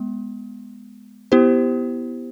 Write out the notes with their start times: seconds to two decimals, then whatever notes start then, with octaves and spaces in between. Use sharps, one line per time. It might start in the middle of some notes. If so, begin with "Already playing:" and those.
Already playing: G#3 B3
1.32 B3 E4 G4 C5